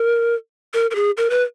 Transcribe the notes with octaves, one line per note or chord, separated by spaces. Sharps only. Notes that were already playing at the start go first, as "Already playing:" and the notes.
Already playing: A#4
A#4
A#4
G#4
A#4
B4